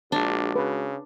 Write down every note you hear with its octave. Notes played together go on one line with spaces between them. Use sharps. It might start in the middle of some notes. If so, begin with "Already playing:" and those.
A#1 G#3 D4 F#4
C#3 B4